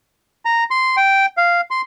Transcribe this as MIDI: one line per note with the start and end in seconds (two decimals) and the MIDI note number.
0.45 0.64 82
0.71 0.96 84
0.97 1.26 79
1.37 1.61 77
1.71 1.81 84